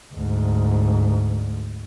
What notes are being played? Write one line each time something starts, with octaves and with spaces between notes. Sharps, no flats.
D2 G#2